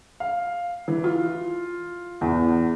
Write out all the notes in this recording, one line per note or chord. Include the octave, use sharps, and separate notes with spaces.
F5
E3
F4
E2